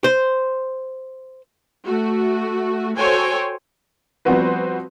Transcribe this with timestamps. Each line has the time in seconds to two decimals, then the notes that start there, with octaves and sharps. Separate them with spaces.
0.04 C5
1.86 A3 F#4
2.97 F#4 A4 C5 C#5 G5 G#5
4.25 F3 G3 B3 C4 F#4 B4